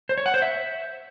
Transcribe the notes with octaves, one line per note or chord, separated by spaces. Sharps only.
C5
C#5
F#5
C5
E5